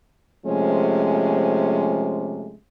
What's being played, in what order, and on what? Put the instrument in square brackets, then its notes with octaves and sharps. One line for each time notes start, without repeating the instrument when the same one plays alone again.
[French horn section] C3 F3 G#3 A3 C#4